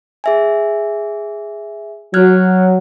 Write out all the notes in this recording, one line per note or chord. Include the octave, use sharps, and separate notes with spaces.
G#4 E5 G#5
F#3 F6 F#6 G#6